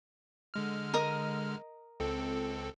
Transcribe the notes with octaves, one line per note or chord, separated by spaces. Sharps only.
D3 G#3 F6
A#4 D#5 D#6
C#2 C4 A4